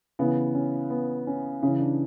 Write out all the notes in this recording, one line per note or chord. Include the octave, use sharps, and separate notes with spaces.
C#3 E3 B3
C#4
B3
C#4
C#3 E3 C#4
D4